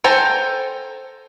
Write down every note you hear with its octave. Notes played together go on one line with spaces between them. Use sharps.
A4 C5 G5 G#5 A#5